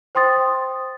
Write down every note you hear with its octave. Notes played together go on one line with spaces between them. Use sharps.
C5 G5 C6 D#6 A6